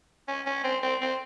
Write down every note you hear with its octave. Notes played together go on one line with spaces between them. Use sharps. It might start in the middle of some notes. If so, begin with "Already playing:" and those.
C#4
C#4
C4
C4
C4